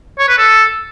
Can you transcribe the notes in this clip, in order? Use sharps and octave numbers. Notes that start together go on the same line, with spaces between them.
C#5
B4
A4